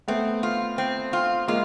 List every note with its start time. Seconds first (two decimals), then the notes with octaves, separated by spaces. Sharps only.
0.08 A3 B3 C4
0.43 F4
0.78 C4
1.13 F4
1.48 G#3 A#3 F4